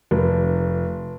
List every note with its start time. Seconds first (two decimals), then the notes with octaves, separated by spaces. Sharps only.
0.11 F1